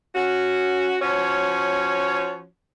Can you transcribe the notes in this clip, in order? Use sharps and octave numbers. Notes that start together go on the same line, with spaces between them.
C#4 F#4
F3 C#4 F#4 C#5